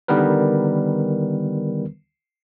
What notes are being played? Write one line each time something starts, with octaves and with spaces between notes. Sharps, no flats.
D3 D#3 G3 B3 A#4 B4